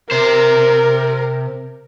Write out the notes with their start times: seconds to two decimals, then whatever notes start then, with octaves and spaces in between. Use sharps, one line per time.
0.11 C3 A#4 C5